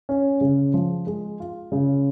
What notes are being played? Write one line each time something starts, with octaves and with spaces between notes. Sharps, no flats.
C#4
C#3
F3
G#3
F4
C#3